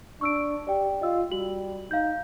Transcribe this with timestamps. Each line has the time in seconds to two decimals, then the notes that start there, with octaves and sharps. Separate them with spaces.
0.21 D4 C#6 E6 D7
0.67 G4 D5 G5
1.02 F4 D#5 E6
1.32 G3 F#4 F#7
1.91 D#4 F5 G6